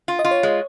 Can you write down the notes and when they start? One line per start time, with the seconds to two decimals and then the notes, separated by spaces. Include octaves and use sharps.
0.08 F4
0.19 D#5
0.25 F4
0.31 C#5
0.43 G#3